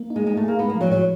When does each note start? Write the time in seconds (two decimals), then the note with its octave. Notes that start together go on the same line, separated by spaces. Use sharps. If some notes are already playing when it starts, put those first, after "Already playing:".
Already playing: A#3
0.10 D#4
0.16 G#3
0.26 G#3 D#4
0.37 A3
0.43 A#3 G#4
0.59 G#3 B3
0.70 A#3
0.76 F3 F#3
0.91 A2 F#3